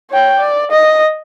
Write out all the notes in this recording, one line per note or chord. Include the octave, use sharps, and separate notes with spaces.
C#5 G5
D5
D#5